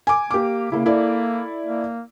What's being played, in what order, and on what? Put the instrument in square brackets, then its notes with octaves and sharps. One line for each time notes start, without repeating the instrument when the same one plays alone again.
[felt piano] G#5 D6
[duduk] A#3 [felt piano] G4 D6
[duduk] C#3 [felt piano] A#3 E4
[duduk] A#3 [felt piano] E4 A4 D5
[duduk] A#3